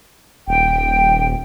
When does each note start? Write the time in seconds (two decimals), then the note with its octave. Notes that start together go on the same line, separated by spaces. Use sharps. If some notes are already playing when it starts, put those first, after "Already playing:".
0.47 D#1 G5